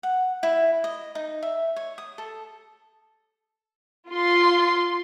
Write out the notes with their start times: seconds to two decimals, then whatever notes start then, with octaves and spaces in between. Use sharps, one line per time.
0.03 F#5
0.43 E4
0.84 D#5
1.15 D#4
1.43 E5
1.76 C#5
1.98 D#6
2.18 A4
4.12 F4 C6